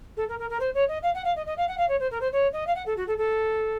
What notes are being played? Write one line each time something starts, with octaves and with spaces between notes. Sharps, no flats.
A4
A#4
A#4
A#4
C5
C#5
D#5
F5
F#5
F5
D#5
D#5
F5
F#5
F5
C#5
C5
A#4
C5
C#5
D#5
F5
F#5
A4
F#4
A4
A4